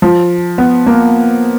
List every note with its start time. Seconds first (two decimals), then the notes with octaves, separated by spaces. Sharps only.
0.02 F3
0.58 B3
0.86 A#3